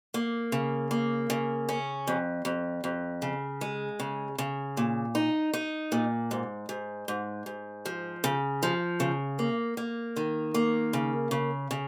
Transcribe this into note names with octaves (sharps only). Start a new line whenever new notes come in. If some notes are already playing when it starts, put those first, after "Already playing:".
A#3
C#3
A#3
C#3
C#4
F2
F2
F2
C#3
G#3
C#3
C#3
A#2
D#4
D#4
A#2
G#2
G#2
G#2
G#2
F3
C#3
F3
C#3
A#3
A#3
D#3
A#3
C#3
C#3
C#3